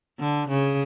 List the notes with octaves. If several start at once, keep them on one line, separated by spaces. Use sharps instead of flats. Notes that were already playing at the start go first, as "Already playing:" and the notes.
D3
C#3